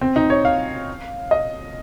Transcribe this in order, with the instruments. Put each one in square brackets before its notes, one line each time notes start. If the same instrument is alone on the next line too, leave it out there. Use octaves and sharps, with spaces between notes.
[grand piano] C4
D#4
C#5
F5
D#5